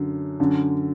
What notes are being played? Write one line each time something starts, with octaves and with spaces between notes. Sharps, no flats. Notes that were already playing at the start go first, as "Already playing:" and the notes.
Already playing: F#2 D3
F#2 D3